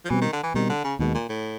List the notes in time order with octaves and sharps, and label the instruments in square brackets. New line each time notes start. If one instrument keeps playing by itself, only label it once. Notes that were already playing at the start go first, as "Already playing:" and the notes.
[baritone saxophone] F3
[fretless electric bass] B2 G3 C4 [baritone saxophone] E3
[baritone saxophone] D#3
D3
E3
[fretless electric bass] B2 G3 C4 [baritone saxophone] D#3
[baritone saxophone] D3
C#3
[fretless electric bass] D#2 D#3 G#3 [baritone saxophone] B2
[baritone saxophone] A#2
A2